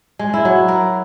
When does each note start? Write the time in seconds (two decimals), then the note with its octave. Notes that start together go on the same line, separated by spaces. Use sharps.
0.19 G#3
0.34 E4
0.45 F#3
0.68 A#4